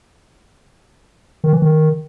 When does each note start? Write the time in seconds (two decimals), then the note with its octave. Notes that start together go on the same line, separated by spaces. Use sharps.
1.44 D#3
1.53 E3
1.62 D#3